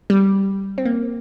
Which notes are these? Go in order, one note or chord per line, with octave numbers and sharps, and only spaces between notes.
G3
C4
A#3